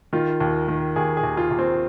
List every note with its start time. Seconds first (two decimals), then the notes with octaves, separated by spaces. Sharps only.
0.13 D#3 F4
0.40 D#2
0.68 D#3
0.96 D#2 G#4
1.17 G#4
1.23 D#2
1.37 F4
1.51 D#2
1.59 C4